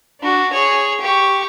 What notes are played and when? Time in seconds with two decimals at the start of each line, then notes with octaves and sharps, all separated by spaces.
0.21 D4 F#4
0.53 G#4 C#5
1.01 G4 C#6